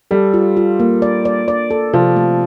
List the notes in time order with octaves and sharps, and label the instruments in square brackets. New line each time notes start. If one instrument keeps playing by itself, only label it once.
[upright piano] G3 [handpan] A4
[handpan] F4
F4
A#3
D5
D5
D5
A4
[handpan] C3 [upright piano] F3
[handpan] A3